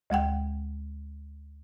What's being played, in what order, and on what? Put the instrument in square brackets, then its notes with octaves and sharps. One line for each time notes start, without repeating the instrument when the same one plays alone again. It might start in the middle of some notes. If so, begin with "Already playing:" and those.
[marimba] D2 G#3 F#5 G5